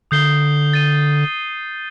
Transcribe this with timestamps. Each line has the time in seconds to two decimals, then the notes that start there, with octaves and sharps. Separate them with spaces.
0.11 D3 D#6 G6 C7 G7
0.73 A6 D#7 G7